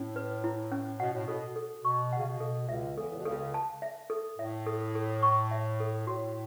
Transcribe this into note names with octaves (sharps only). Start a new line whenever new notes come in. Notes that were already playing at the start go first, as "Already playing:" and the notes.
Already playing: A2 C#4
B4
E4
C#4
B2 F#5
A2
B2 A4
A4
B2 C#6
F#5
C#3
B2
A4
C#2 C#3 E5
E2 E3 A4
A2
B2
C#2 C#3 A4
A5
E5
A4
A2 E5
A4
A4
C#6
E5
A4
A2 F#4